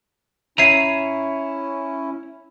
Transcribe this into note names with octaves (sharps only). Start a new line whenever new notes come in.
C#4 E4 C#5 E5 A#5 C7 D#7